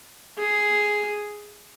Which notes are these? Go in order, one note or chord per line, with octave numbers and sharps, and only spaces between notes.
G#4